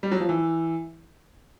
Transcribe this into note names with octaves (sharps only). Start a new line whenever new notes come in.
G3
F#3
F3
E3